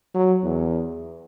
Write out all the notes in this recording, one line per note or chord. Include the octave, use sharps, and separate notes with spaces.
F#3
E2